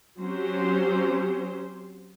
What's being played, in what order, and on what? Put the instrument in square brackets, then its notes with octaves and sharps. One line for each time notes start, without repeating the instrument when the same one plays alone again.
[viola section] F#3 C4 C#4 G4 C5